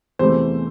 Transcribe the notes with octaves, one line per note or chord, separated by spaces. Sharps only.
E2 C3 E3 A3 C5